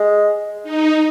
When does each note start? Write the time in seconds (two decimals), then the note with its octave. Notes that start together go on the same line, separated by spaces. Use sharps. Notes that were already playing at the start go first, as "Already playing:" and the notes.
Already playing: G#3
0.63 D#4